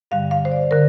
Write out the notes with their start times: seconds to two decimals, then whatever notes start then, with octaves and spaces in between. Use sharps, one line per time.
0.11 G2 D3 G3 F5
0.31 F5
0.45 C5
0.52 D5
0.71 D3 A#4